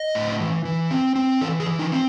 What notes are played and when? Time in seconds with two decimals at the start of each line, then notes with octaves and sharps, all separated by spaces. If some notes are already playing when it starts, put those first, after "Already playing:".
Already playing: D#5
0.15 A2
0.40 E3
0.65 E3
0.91 C4
1.16 C4
1.41 E3 A4
1.60 G#4
1.66 E3
1.79 D#4
1.92 C4